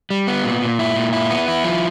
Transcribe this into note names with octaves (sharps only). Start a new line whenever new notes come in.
G3
B3
A#2
A#2
E4
A#2
E4
B3
E4
F3